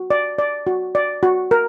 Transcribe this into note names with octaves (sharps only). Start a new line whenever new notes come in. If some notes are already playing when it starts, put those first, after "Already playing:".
Already playing: F#4
D5
D5
F#4
D5
F#4
A#4